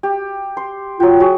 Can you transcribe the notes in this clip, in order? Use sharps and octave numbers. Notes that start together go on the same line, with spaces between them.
G4
C6
F#3 F4 G5
F#4 G#4